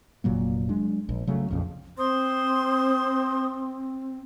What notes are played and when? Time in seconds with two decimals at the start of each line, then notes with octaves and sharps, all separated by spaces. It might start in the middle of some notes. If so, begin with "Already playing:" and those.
0.24 F1 A#2 F#3 A#3
0.69 F#3 G#3 D4
1.09 A#1
1.27 C#3 F#3 A3
1.51 A#1 F2 C#3
1.98 C4 C5 C6 D#6